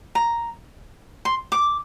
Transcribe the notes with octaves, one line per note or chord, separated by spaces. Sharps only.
A#5
C6
D6